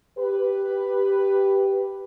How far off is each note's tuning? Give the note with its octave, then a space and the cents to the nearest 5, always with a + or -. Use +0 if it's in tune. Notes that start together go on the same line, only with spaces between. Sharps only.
G4 +0 B4 +0